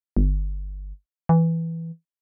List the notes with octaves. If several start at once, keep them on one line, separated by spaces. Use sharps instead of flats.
G1
E3